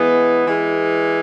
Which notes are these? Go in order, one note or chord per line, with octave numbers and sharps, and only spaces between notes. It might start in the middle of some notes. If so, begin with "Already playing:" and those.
Already playing: E3 G#3 B3
E3 G#3